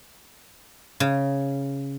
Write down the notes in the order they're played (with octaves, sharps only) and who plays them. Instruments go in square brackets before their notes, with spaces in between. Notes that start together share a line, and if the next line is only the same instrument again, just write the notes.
[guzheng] C#3